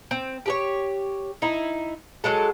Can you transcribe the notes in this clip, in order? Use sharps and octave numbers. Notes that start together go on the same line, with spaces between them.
C4
G4 G#4 C#5
D#4 E4
F#3 G#3 A4